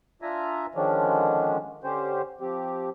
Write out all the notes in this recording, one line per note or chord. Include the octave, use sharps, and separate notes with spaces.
D4 F4 E5 G#5 A#5
D3 D#3 F3 G#3 C#4 D4
D3 C#4 G4 C5
F3 C4 G4